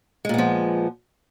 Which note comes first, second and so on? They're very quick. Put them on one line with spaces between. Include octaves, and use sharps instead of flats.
G#3 A#2 B3 F3